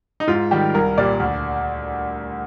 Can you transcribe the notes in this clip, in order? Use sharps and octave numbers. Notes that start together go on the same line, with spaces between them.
D#4
G#2 F4
D#3 G3 G4
C2 A#4
A#2 G3 D5
D2